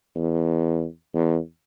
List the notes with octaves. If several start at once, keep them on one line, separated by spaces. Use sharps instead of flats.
E2
E2